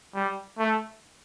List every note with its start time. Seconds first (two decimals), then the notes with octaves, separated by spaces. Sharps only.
0.15 G3
0.58 A3